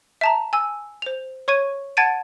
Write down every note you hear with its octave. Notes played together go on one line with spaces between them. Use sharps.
E5 A5 A#5
G#5 E6
C5 F7
C#5 C#6 G#6 D#7
F#5 A5 G#6 A6 D7 D#7